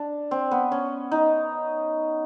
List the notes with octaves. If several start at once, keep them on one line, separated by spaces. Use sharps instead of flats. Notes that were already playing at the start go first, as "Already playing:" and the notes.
Already playing: D4
C4
B3
C#4
D#4